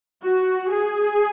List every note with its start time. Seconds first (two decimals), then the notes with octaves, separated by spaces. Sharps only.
0.24 F#4
0.70 G#4